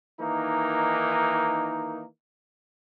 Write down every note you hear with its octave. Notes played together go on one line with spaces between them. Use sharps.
D#3 E3 A#3 D#4